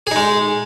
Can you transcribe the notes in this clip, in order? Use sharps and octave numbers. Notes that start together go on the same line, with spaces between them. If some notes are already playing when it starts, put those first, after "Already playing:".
G#3 D#4 G#4